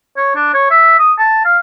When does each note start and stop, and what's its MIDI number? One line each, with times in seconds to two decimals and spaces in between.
0.17 0.34 73
0.36 0.51 62
0.54 0.70 73
0.71 0.99 76
0.99 1.13 87
1.18 1.44 81
1.45 1.58 77